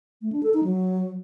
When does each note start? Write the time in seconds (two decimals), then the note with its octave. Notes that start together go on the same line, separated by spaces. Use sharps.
0.22 A3
0.32 D4
0.43 A4
0.54 D#4
0.64 F#3